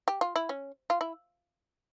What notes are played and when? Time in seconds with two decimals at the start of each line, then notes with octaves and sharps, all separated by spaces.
0.08 G4
0.21 F4
0.36 E4
0.49 C#4
0.90 F4
1.01 E4